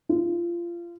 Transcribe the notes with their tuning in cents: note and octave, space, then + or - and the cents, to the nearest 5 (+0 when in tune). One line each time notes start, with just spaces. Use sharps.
F4 -25